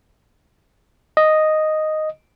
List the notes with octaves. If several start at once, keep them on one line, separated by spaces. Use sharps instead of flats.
D#5